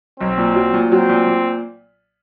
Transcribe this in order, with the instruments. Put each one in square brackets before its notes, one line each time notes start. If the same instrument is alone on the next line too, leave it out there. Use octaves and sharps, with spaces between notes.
[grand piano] B1 [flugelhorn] C4
[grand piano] A#2
F#3
A#2
[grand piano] F#3 [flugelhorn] C4
[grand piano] A#2
A#2